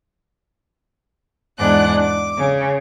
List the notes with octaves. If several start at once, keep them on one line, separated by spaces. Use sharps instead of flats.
E2 G#2 D4 F#5 D6 F#6
D6
C#3